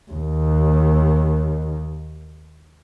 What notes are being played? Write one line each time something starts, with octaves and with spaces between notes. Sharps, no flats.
D#2 D#3